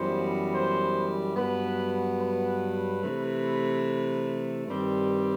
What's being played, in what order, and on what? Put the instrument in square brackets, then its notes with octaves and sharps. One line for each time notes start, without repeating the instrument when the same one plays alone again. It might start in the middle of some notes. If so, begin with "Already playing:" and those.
Already playing: [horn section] F#2 E3 G3 B3 C5
C5
G2 F#3 B3 B4
B4
C3 E3 A3
G2 D#3 G3 C4